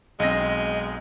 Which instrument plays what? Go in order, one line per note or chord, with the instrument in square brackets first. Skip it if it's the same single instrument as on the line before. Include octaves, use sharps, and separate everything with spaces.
[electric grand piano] B1 A#6 [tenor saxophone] G#3 [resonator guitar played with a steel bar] C4 D#5